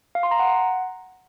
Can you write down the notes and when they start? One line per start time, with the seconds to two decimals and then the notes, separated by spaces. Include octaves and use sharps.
0.15 F5
0.23 C6
0.31 A#5
0.39 F#5